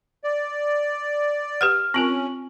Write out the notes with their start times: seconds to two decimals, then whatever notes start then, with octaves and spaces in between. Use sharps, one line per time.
0.24 D5
1.61 G4 B4 F#5 F6
1.94 C4 C#4 F4 A#4 C#6 F#7